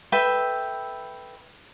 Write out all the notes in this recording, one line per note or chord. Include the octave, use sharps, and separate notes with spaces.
A4 B4 E5 G5